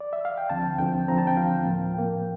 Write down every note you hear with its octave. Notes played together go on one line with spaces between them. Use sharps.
D5
E5
F5
G5
D2 D3 F3 C4 A5
D2 D3 F3 C4 G5
D2 D3 F3 C4 A#5
A5
G5
D2 D3 F3 C4 F5
A2 F3 A#3
A2 F3 A#3 G5